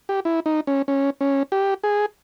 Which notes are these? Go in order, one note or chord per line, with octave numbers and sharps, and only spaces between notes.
G4
E4
D#4
C#4
C#4
C#4
G4
G#4